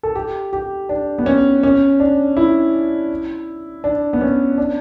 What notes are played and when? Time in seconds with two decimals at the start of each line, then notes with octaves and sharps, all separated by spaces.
0.03 A4
0.15 G4
0.53 G4
0.89 D4
1.18 B3
1.26 C#4
1.63 C#4
2.00 D4
2.37 E4
3.84 D4
4.13 B3
4.21 C#4
4.58 D4